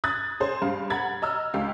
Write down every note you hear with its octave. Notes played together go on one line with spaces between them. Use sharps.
D#6 F#6 G#6 A6
G#4 C5
G2 F5
F#5 A#5 B5 G#6 A6
D#5 A#5 E6 F6
C#2 G4 F5